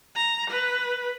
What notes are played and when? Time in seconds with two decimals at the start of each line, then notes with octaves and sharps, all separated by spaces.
0.16 A#5
0.50 B4